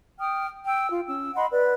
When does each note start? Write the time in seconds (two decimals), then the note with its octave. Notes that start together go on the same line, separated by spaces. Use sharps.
0.19 G5 D#6 F6
0.66 G5 E6
0.90 F4
1.06 C#4 E6
1.35 D#5 F#5 B5 C6
1.52 B4 D5